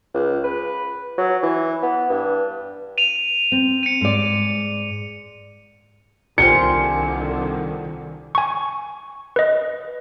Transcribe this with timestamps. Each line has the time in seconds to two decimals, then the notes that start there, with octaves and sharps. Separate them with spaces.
0.14 C#2
0.44 B4
1.18 F#3
1.43 E3
1.83 B3
2.10 G2
2.98 D#7 F7
3.52 C4
3.83 C#7 D#7
4.01 G#2 D5
6.38 C2 D3 D#3 G3 F4 C5 G#5 C#7
8.35 G#5 C#6
9.36 B4 D#5